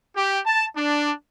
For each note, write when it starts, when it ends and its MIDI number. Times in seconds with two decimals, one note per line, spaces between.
0.16 0.39 67
0.46 0.66 81
0.77 1.12 62